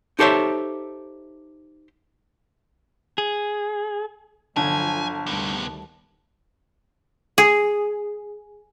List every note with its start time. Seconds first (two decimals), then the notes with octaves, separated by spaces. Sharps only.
0.19 D#4 G4 A4 C5 C#5 E5
3.18 G#4
4.56 G1 D3 F3 F#3 G#5 A5
5.26 D2 C3 D#3 G3 B3
7.38 G#4